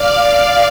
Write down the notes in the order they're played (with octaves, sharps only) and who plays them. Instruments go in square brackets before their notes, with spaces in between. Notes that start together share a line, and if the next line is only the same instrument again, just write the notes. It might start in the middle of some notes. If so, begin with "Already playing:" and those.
Already playing: [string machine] D5 F5